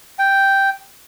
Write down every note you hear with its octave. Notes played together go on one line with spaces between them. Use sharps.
G5